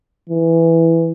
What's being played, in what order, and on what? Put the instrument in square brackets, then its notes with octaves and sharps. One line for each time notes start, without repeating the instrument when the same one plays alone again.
[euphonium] E3